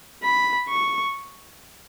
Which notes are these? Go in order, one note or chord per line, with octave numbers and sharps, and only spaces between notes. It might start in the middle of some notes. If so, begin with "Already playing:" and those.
B5
C#6